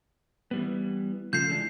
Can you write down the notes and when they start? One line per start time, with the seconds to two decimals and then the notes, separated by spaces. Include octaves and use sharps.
0.51 E3 G3 B3
1.33 C#3 F3 A3 G6 C7
1.50 E3 G#3 D4